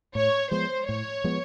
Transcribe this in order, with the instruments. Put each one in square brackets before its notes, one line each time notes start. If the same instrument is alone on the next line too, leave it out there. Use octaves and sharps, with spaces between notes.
[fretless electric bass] A2 [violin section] C#5
[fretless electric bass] F3 G#3 B3 [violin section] C5
[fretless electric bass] A2 [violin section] C#5
[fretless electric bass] F3 G#3 B3